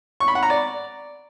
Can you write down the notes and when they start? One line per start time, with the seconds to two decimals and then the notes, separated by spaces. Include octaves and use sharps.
0.20 C#6
0.28 B5
0.35 F#5
0.43 A#5
0.50 D5